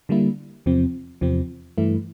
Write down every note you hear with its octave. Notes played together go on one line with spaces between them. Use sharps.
D3 G3 A#3 E4
E2 C3 F3 C4
E2 C3 F3 C4
G2 E3 A3 E4